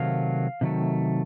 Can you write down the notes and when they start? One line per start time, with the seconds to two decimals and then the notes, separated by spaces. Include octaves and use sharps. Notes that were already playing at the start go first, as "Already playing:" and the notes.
Already playing: C3 D#3 F#3 A3 F5
0.61 C3 D#3 F#3 A3